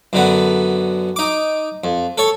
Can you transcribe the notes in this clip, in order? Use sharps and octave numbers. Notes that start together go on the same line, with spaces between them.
F#2 D3 B3
D#4 D6
F2
A4 C#5